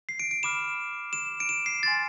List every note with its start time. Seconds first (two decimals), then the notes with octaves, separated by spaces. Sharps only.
0.09 C7
0.20 D7
0.31 D7
0.43 B5 D6 F6 E7
1.13 E7
1.40 D7
1.49 E7
1.66 C7
1.83 G#5 C6 F6 A6